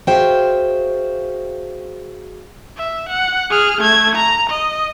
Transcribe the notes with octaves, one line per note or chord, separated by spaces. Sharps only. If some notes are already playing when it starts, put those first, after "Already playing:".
F#4 G#4 C5 E5 F5 G5
E5
F#5
G#4 F6
A3 G#6
A#5
D#5